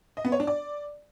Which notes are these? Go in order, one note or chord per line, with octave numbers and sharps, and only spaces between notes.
D#5
B3
C#5
D4
D5